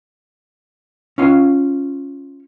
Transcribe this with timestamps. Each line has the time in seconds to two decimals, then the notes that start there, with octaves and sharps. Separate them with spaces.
1.18 C#4 F4 F5